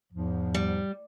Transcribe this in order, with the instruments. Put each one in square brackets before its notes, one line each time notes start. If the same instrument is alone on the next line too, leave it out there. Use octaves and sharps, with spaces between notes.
[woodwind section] E2 G#2 F3
[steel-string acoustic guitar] G3